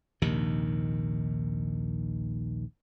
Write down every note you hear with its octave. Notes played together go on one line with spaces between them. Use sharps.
A#1 D#2 C3 D#3